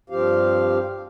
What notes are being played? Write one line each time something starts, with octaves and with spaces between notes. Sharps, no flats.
G2 F3 C4 G4 F5